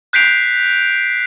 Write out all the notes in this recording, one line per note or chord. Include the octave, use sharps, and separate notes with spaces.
F#6 G6 B6 C7 D7 F7